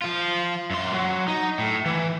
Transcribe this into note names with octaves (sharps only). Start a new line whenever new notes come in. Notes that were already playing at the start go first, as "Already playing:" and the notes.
F3 F4
F#2 C6
F#3
D#4
A2
E3